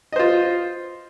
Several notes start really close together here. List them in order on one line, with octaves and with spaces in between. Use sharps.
D#5 C5 F4